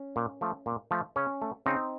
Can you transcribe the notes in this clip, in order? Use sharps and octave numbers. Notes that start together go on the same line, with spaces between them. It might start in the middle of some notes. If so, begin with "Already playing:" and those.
Already playing: C#4
A#2
F3 A3
A#2
F3 A3
C#3 C#4
A3
C#3 C4 D#4